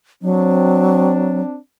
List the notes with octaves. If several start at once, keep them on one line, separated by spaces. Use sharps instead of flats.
F#3 C4 D4